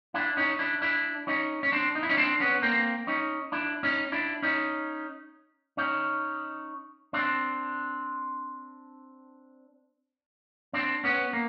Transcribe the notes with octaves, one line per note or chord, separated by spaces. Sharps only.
D4 E4
C#4 D#4
D4 E4
D4 E4
C#4 D#4
C#4
C4 D4
D#4
E4
C#4 D#4
C4 D4
B3 C#4
A#3 C4
C#4 D#4
D4 E4
C#4 D#4
D4 E4
C#4 D#4
C#4 D#4
C4 D4
C4 D4
B3 C#4
A#3